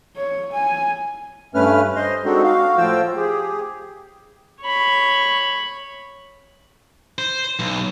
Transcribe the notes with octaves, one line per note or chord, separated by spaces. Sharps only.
C#5
G#5
G2 A3 C#4 B4 F6
C5 D#5 C6
G#3 C4 D4 D#4 F#4 A4
F#4 F5
A2 F3 F4 C5 G5 E6
G4 G#4
C#5 B5
C5
B1